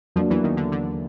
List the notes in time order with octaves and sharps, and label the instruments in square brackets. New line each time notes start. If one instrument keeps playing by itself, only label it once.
[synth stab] F2 F3 [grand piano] F#3 A#3 D4
[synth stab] E2 E3
D#2 D#3
D3
D3